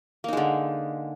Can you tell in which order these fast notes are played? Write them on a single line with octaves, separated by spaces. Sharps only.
A#3 D#4 G#3 D3